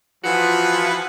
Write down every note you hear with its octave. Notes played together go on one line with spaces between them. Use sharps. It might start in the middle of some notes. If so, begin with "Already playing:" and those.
E3 F3 F4 F#4 G#4 B4